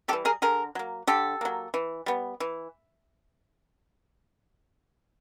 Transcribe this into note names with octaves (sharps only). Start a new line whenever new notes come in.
E3 G3 G4 A4
G#4 A#4
D3 G#4 A#4
F#3 A#3
D3 G4 A4
F#3 A#3
E3
G3 B3
E3